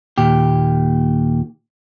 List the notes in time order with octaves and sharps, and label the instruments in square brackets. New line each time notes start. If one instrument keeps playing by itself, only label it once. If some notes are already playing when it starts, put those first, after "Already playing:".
[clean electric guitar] D#2 A#2 G4